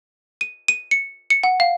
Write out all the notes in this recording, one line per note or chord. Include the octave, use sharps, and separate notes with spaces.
D#7
D#7
C#7
C#7
F#5
F5